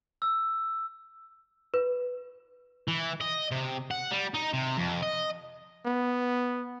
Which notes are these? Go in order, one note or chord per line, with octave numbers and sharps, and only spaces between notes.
E6
B4
E3
D#5
C3
F#5
G3
D#4
C3
F2
D#5
B3